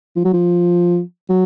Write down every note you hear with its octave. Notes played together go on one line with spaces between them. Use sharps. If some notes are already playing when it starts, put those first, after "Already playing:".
F3
F#3
F3
F#3